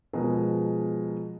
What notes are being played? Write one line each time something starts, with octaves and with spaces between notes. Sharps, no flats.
B2 F3 G#3 G#4 A#4